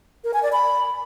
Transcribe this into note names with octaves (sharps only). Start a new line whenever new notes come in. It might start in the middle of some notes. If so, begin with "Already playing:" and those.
A#4
G#5
D5
B5